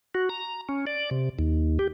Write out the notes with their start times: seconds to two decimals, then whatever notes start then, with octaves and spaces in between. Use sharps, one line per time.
0.15 F#4
0.29 A#5
0.69 C#4
0.87 D5
1.11 C3
1.39 D#2
1.79 G4